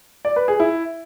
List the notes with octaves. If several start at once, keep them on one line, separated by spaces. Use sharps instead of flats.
D5
B4
G#4
E4